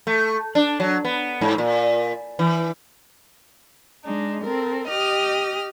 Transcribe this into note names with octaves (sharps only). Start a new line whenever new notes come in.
A3
D4
F#3
B3
G#2
A#2
E3
G#3 D4 D#4
C4 A4 A#4
G4 D#5 D#6 F6